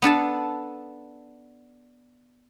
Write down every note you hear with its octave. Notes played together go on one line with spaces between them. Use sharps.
B3 D4 A4 A5